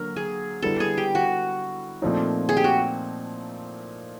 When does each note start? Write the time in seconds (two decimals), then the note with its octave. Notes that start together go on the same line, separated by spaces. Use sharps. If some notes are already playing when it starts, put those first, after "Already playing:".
Already playing: D3 F#3 A#3 A#4
0.16 G#4
0.62 D3 G3 B3 E4 A4
0.80 G#4
0.98 G4
1.15 F#4
2.02 A#2 F3 A3 C4 D#4
2.49 G#4
2.57 G4
2.64 F#4